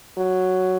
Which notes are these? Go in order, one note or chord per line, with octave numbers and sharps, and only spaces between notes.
F#3